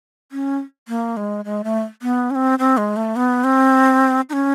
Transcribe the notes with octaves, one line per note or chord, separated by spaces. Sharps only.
C#4
A#3
G#3
G#3
A3
B3
C#4
C4
C4
G#3
A3
B3
C4
D#4
C#4